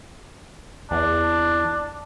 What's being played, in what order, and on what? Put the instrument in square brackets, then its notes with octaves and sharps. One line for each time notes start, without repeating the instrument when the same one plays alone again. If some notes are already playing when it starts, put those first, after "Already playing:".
[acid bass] E2 [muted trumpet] D4